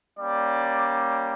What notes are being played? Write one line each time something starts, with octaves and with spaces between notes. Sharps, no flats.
G3 A#3 C#4 D5